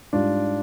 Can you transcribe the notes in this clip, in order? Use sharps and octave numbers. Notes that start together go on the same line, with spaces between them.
G#2 G3 D4 F4